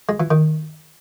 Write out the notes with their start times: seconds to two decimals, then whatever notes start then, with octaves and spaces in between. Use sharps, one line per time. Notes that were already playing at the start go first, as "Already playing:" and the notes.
0.09 G#3
0.20 E3
0.31 D#3